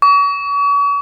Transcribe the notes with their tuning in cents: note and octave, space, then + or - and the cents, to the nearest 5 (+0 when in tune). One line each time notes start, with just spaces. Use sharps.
C#6 +40